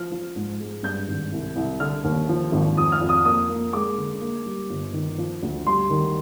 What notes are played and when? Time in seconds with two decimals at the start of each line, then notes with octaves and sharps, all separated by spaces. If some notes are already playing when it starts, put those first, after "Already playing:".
Already playing: F3 F6
0.12 F3
0.36 G#2
0.60 G#3
0.83 G2 G6
1.08 G#1
1.32 C2
1.56 C2
1.80 D3 F6
2.04 D#2
2.29 F3
2.52 G#1
2.77 F2 D#6
2.92 F6
3.01 F2
3.09 D#6
3.25 A#3 D#6
3.49 A#3
3.73 G#3 D6
3.97 D3
4.21 A#3
4.46 G3
4.70 G1
4.93 D#3
5.18 F3
5.43 D2
5.67 G3 C6
5.90 D#3